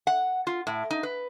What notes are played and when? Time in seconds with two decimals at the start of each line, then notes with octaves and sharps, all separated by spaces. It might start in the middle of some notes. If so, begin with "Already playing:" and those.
0.07 F#5
0.47 F4
0.67 A2
0.91 D#4
1.03 B4